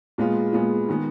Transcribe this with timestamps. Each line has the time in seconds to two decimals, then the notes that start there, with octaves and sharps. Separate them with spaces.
0.18 A#2 G#3 B3 F4
0.53 A#2 G#3 B3 F4
0.89 D#3 G#3 B3